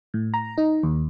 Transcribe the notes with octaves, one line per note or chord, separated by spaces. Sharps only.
A2
A#5
D#4
D#2